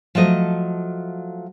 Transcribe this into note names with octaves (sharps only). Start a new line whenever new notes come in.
F3 F#3 A3 D#5